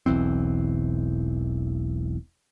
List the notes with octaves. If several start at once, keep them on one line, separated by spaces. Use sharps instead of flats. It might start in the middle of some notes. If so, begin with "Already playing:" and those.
E1 B1 E3 C4